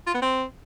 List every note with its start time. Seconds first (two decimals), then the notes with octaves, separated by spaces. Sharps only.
0.07 F4
0.14 B3
0.22 C4